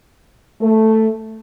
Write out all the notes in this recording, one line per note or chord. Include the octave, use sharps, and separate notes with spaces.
A3